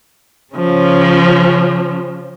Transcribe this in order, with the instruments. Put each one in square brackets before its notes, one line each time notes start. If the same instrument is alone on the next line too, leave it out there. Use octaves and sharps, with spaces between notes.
[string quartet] C#3 F3 C#4